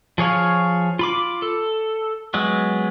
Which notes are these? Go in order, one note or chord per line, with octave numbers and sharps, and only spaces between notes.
F3 G#4 C#5 F5
F4 B5 D6
A4
F#3 G#3 B3